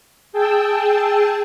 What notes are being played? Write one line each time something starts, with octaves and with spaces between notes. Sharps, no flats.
G#4 G5 A5 E6